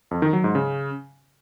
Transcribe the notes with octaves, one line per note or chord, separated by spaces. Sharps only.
F2
D#3
F#3
G#2
C#3